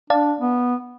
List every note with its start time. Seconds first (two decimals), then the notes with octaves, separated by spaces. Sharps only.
0.10 D4 D5 F5 A5
0.41 B3